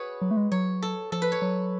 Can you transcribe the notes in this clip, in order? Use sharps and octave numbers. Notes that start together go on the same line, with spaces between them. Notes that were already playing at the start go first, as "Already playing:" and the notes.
Already playing: F#4 G#4 B4 C#5
F#3
A3
G#3
F#3 C#5
A4
F3 A4
B4
C#5
F#3